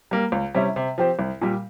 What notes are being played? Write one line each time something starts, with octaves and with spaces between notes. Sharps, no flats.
G3 A#3
C#2
C3 G3 C#4 E4
C3
F3 C4 G4 C5
C2
A#2 G3